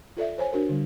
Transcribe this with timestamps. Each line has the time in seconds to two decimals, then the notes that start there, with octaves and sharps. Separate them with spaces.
0.17 F4 A4 D5 E5
0.38 C5 C#5 G#5
0.53 D4 F#4 A#4
0.69 D3 G3